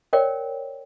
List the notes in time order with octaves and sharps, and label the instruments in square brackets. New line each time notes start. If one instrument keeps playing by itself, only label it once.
[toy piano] A#4 C#5 D5 G5